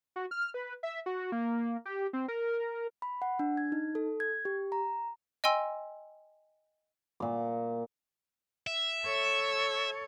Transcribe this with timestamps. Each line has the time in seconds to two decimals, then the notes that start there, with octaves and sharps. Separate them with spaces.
0.16 F#4
0.31 F6
0.54 B4
0.83 E5
1.06 F#4
1.32 A#3
1.85 G4
2.13 C4
2.28 A#4
3.02 B5
3.22 F#5
3.39 D4
3.57 G#6
3.72 D#4
3.95 A4
4.20 G#6
4.45 G4
4.72 A#5
5.44 D#5 G5 G#5 C6 E6
7.20 A#2 D6
8.67 E5
9.03 A4 C#5